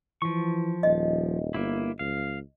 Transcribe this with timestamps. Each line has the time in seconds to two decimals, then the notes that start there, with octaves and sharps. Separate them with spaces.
0.22 E3 F3 C#6
0.83 D#1 D#5
1.54 G1 A#3 E4
1.99 C#2 F5